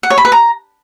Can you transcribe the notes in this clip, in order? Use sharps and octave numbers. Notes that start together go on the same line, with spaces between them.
F#5
C#5
B5
B4
A#5